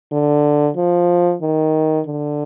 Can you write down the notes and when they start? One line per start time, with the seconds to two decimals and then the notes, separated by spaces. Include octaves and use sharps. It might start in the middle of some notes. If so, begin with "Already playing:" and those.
0.12 D3
0.77 F3
1.42 D#3
2.06 D3